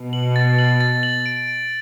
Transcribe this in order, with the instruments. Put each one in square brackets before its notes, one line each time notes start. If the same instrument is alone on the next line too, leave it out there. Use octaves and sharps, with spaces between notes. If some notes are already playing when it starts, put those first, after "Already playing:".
Already playing: [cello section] B2
[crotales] F#7
A6
F#7
A6
F#7
D7
D7